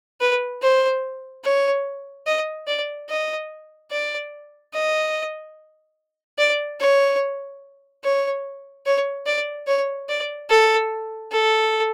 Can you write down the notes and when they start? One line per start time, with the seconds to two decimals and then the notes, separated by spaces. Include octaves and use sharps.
0.21 B4
0.62 C5
1.44 C#5
2.27 D#5
2.67 D5
3.10 D#5
3.91 D5
4.74 D#5
6.39 D5
6.80 C#5
8.04 C#5
8.86 C#5
9.26 D5
9.67 C#5
10.09 D5
10.50 A4
11.32 A4